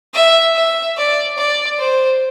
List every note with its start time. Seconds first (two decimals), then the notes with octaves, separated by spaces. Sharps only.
0.14 E5
0.55 E5
0.97 D5
1.38 D5
1.79 C5